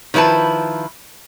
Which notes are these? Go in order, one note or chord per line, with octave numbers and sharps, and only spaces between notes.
D#3 F3 E4 B4 A5